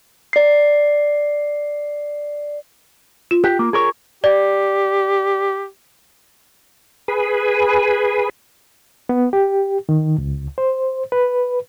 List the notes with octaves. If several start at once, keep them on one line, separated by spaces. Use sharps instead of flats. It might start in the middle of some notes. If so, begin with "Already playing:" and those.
D5 C7
F4
G4 F#6
A#3
G#4 A#4 C#5
G4 D5
G#4 B4
B3
G4
D#3
C#2
C5
B4